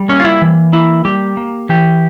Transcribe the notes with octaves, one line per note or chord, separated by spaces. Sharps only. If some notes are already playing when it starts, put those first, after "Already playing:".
Already playing: G3
A#3 C#4
F4
E4
E3
A#3 E4
G3 G4
A#3
E3 G4